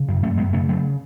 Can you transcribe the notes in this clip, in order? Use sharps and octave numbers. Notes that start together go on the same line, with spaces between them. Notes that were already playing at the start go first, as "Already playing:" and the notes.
Already playing: C#3
F#2
F#2 A3 C#4
F#2 G#3 B3
C#3 A3 C#4
C#3 F#3 A3